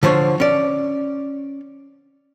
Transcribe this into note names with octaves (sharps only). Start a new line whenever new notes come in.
D3 F3 C5 C#5
C#4 D5